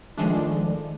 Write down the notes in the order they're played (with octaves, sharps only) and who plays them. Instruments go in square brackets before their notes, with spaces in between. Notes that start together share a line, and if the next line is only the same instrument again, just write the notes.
[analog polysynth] D#3 F3 G#3 A3 D4